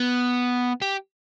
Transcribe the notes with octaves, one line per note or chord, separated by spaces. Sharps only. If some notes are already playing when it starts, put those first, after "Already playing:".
Already playing: B3
G4